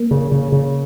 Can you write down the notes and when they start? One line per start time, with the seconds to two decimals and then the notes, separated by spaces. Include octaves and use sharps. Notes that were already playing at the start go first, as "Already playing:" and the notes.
Already playing: A#3
0.11 C#3
0.32 C#3
0.52 C#3